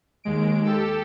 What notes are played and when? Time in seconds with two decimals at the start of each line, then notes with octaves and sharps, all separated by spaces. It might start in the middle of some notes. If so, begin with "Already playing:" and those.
0.24 D#2 G#3 D7
0.65 G4 A4 E6